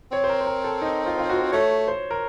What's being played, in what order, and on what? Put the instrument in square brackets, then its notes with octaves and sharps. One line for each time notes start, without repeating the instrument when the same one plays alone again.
[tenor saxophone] C4 [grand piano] C#5
[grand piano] C5
A#4
C5
A#4
A4
D#4
F4
F4
F#4
[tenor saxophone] A3 [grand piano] C#5
[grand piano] C5
A#4